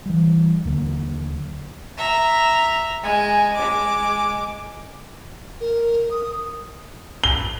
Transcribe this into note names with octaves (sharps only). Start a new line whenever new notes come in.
E3 G3
D#2 D3 F#3 A#3
E5 A#5
G#3 G#5
G#3 D6
A#4
D#6
G7